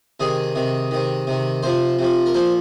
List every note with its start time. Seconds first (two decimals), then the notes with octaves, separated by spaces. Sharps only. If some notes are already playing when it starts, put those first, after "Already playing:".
0.20 C3 D#3 G#4
0.55 C3 D#3
0.91 C3 D#3
1.27 C3 D#3
1.63 C3 F3 C5
1.99 C3 F3
2.26 A#4
2.34 A#2 F3 C5